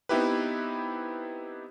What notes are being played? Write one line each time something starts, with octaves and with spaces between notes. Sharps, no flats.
B3 C4 D#4 E4 G4 B4